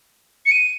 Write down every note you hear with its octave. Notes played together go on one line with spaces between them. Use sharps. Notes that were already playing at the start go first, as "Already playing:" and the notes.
C#7
D#7